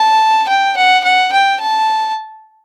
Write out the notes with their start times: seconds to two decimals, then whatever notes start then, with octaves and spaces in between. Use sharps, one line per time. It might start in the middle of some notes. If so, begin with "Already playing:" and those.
Already playing: A5
0.48 G5
0.77 F#5
1.04 F#5
1.32 G5
1.61 A5